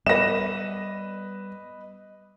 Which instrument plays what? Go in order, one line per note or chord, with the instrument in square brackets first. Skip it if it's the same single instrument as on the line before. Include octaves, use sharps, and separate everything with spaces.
[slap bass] G3 B3 [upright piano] B4 D#5 [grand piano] A#6 E7